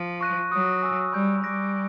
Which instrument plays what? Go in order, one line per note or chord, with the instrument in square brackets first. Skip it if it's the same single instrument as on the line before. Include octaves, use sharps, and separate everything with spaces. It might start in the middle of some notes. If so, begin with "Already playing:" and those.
Already playing: [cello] F3
[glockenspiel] C#6 F#6 A#6 D#7
[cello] F#3 [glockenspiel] B5 D#6 F#6
[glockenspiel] G#5 C#6 E6
[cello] G3 [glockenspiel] B5 D#6 G6
[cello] G3 [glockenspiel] D6 F#6 A#6 D7